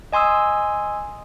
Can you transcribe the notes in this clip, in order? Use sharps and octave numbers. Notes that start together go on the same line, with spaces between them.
D#5 G#5 C6 D#6 E6